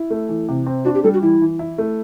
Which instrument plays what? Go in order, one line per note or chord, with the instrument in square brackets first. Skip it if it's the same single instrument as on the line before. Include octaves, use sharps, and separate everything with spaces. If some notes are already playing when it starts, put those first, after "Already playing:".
Already playing: [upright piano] E4
A3
E3
C3
C4
[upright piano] D4 [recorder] F#4
[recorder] G4
[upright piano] G3 [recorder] A4
[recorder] F#4
[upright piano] E3 [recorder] E4
[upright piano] E3
E4
A3